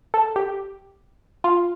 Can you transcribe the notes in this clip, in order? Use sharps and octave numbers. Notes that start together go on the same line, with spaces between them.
A4
G4
F4